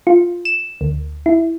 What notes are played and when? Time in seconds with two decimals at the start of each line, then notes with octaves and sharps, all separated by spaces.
0.07 F4
0.45 E7
0.81 D2
1.26 E4